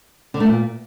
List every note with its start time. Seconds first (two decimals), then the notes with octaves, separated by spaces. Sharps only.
0.34 D3
0.40 A3
0.46 A#2